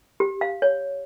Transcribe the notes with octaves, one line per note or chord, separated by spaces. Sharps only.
G4
F5
C#5